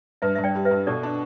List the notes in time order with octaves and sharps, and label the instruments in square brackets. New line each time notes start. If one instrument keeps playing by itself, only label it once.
[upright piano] G2 [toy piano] B4 E5
[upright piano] G2 [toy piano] E5
[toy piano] D5 G5
[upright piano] G3
[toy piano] B4 E5
[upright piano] G2
[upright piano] B2 [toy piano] A4 D5
[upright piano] D4